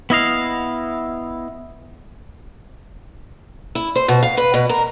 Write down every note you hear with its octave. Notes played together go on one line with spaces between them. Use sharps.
B3 E4 D#5 F5
E4
C5
B2
F5
B4
B2
A#4